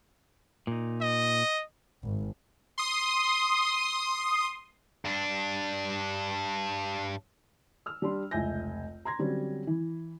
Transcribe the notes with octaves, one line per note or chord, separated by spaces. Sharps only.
A#2 D#4
D#5
G#1
C6 D#6
G2 D4
E6 F6
G3 D4 C6
F1 C#2 E5 G#5 G6 A#6
A#5 C6 G#6 A#6
D3 F#3 G3 C4 C#4
E3